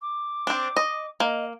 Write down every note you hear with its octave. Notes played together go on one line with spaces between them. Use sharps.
D6
C4 D4
D#5
A#3 D#5